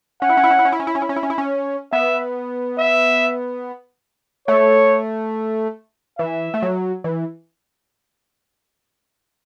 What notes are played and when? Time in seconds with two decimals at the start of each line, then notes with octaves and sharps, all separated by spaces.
0.22 C#4 F#5
0.29 E4
0.37 C#4
0.44 E4
0.51 C#4
0.59 E4
0.65 C#4
0.72 E4
0.80 C#4
0.87 E4
0.95 C#4
1.02 E4
1.09 C#4
1.16 E4
1.23 C#4
1.30 E4
1.38 C#4
1.92 B3 E5
2.79 E5
4.48 A3 C#5
6.19 E3 E5
6.54 A3
6.62 F#3
7.04 E3